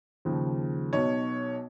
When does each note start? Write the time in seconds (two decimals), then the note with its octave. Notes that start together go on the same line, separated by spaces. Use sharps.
0.25 D#2 C#3 F3
0.93 B1 B2 C#5